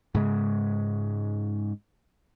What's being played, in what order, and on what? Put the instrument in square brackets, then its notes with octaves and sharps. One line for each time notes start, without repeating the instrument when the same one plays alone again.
[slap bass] G#2 C#3 G#3